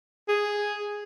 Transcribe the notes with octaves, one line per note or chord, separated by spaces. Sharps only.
G#4